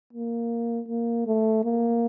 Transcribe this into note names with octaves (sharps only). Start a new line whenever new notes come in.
A#3
A#3
A3
A#3